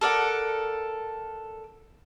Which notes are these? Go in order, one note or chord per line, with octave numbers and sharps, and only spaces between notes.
A4 A#4 D5 F#5